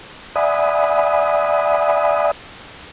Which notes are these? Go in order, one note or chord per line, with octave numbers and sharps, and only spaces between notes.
D5 E5 F#5 G#5 B5 D#6